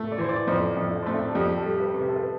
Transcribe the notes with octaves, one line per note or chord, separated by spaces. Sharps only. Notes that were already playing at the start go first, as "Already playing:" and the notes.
Already playing: A3
D5
E3 C5
D5
F2 C5
F2
D4
A3 C4
D4
A4
F2 G4
G4
A4
G3
A4
B4
C3
B4
A4
B4